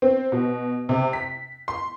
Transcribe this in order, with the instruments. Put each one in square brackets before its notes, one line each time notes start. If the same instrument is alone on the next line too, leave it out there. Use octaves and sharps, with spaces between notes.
[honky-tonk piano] C4
B2
C3
B6
C6